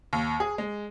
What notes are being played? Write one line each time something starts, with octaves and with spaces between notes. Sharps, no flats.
D#2
G#4
G#3